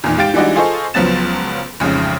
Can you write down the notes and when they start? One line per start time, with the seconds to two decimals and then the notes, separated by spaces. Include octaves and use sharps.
0.04 E2 A#2 D#3
0.17 G#2 G4 F5 G5 A6 D7
0.34 E3 G3 G#3 D4 D#4 F#4
0.56 F4 G#4 A4 C5 D#5 C#6
0.94 C#2 F3 F#3 B3 A6 E7
1.80 A1 F2 G#2 C#3